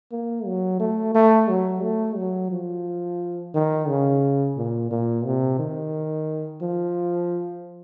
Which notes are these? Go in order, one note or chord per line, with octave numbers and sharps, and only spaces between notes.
A#3
F#3
A3
A3
F#3
A3
F#3
F3
D#3
C#3
A#2
A#2
C3
D#3
F3